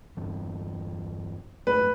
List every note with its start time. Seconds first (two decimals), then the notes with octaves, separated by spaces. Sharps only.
0.17 E2 G2 E3
1.67 G#1 F#2 A3 B4